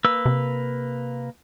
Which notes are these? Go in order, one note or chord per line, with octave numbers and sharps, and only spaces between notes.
A#3 B4 E6
C3